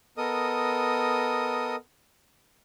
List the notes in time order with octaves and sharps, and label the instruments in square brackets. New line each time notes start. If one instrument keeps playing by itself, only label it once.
[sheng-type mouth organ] B3 A4 A#4 D#5 D#6